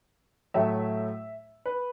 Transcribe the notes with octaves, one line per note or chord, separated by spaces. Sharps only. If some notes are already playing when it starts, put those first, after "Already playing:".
A2 F#3 A3 E5
B4